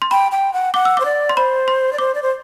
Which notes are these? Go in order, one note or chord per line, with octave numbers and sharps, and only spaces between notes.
C6
G5 B5
G5
F#5
F#5 D6
E6
C5 D6
D5
C6
C5 B5
C6
D5
C5 D6
D5
C5